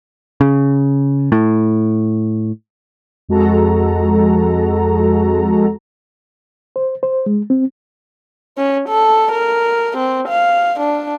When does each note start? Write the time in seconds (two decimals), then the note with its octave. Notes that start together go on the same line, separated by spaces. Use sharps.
0.41 C#3
1.32 A2
3.28 F2 G#3 F#4 A4 A#5
6.76 C5
7.03 C5
7.26 G#3
7.50 C4
8.57 C#4
8.89 A4
9.32 A#4
9.97 C4
10.28 F5
10.80 D4